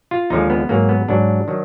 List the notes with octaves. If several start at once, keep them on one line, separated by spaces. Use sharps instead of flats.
F4
D#2 D3 F3 G#3 D#4
B3
G#2 F#3 A#3
B3
G#2 F#3 D4
D#3 F#3